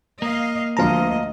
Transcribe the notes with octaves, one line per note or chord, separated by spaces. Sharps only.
A#3 D#5 F5
D2 D3 F3 D#5 F5 A5 A#5